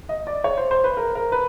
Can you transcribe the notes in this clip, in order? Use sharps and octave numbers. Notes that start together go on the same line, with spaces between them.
D#5
D5
C#5
C5
C5
B4
A#4
A#4
B4